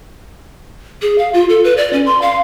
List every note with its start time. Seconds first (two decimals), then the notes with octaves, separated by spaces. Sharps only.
1.02 G#4
1.18 F5
1.34 F4
1.49 A4
1.64 B4
1.77 D5
1.93 C#4
2.06 C6
2.22 F5